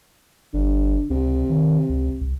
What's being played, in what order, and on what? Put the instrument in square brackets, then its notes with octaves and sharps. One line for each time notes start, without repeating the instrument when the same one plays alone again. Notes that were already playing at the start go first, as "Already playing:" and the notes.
[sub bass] G1 [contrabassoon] D3
[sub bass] C#2 [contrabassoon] C3
[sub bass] D#3
C#2
C2